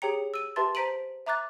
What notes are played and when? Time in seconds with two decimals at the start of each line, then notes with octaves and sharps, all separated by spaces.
0.02 G4 G#4 C#5 G5 A#5 C#7
0.34 E6 D#7
0.56 G4 B4 E5 A5 C6 A6
0.75 C5 A#5 B6 D7 D#7 F#7
1.26 E5 A#5 D6 F#6 A6